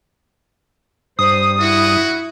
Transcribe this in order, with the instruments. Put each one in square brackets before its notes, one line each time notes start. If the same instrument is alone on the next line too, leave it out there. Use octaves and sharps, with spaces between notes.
[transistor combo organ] G2 [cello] C5 [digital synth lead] D#6
[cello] E4 [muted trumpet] F#4